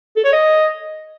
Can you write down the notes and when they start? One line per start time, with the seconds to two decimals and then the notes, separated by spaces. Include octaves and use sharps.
0.16 A4
0.25 C#5
0.33 D#5